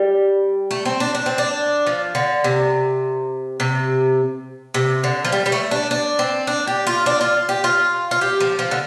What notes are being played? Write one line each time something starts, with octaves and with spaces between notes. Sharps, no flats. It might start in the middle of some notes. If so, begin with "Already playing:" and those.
Already playing: G3
A3
C4
D4
D4
C4
D4
F3
D3
C3
C3
C3
D3
F3
G3
G3
A3
D4
D4
C4
D4
G4
F4
D4
F4
G4
F4
F4
G4
F3
F3
D3